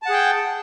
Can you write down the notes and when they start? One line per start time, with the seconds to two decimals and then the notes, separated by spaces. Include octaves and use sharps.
0.03 A5
0.06 F#5
0.10 G#4
0.13 G5